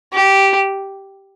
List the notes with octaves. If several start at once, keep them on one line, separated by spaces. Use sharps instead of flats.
G4